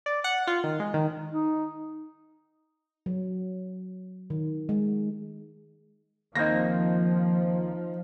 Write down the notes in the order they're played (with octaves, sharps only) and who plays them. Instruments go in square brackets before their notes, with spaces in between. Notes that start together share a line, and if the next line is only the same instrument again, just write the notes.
[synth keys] D5
F#5
F4
D#3
G#3
D#3
[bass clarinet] D#4
[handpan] F#3
D#3
G#3
[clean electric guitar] D#2 A#3 C4 [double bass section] F3 [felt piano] D#4 A#6